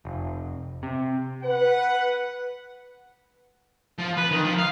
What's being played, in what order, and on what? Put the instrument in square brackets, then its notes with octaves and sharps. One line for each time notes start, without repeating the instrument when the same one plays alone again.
[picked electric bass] F1
C3
[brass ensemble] B4 F#5
[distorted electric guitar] F3
B4
D#3
F3
F5